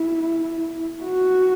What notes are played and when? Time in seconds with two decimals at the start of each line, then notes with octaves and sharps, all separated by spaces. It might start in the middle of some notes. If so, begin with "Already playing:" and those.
Already playing: E4
1.04 F#4